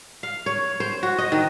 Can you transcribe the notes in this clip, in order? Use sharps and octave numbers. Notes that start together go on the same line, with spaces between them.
F5
C#5
C5
F#4
D#5
D#3